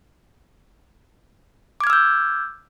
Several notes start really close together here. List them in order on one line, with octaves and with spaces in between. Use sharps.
D6 G#6 F6 E6 G6